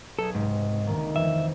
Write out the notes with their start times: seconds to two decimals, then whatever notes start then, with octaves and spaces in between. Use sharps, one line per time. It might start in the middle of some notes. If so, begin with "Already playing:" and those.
0.19 B1 G#4 A4
0.35 C#2 G#2 C3
0.86 D2 D#3 A#3
1.16 F2 E3 E5